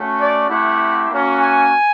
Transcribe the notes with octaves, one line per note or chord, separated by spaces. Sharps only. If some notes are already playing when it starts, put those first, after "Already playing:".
Already playing: A3 C#4 F#4
D5
A3 C4 E4 G4 F#5
A#3 C#4 F#4
G#5